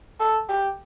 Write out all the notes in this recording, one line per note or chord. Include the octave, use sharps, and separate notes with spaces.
A4
G4